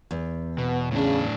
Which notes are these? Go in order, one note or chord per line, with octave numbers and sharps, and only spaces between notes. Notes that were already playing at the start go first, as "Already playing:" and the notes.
E2
B2 B3
A2 C#3 D4